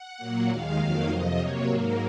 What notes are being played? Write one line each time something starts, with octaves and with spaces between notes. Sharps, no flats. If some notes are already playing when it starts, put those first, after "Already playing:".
Already playing: F#5
A#2 F#3 A#3
D#2 D#3 G#3 F5
F2 D#3 F#3 A#3 F5
F2 C3 F3 D#5
C3 F#3 A#3 C#5
G#2 F#3 A#3 A#4